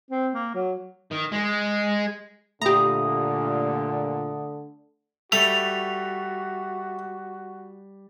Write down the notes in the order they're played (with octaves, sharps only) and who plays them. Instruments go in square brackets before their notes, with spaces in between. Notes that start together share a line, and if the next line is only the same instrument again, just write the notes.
[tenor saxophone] C4
A#3
F#3
[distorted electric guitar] D#3
G#3
[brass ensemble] A#2 [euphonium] D3 [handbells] A3 D#6 [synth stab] G4 A#5
[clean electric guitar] G3 [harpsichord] A3 [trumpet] F#4 [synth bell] F7